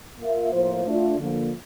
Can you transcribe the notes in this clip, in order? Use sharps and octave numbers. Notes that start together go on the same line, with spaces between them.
A#3 F4 A#4 E5
A2 F3 A#3 F4 C5
A3 D4 F4
D3 F3 A#3